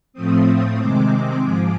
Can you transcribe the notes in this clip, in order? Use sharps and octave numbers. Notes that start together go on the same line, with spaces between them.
A2 F3 A3 C4 D#6
C3 D#3 G#3 C4 D6
G#2 F3 G#3